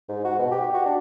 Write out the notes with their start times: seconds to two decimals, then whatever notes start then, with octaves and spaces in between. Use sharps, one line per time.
0.09 G#2
0.24 F#4
0.39 B2
0.51 G4
0.74 F#4
0.86 D4